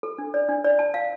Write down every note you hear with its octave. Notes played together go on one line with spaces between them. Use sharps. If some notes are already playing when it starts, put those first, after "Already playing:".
A4
D4
D5
D4
D5
A5
F5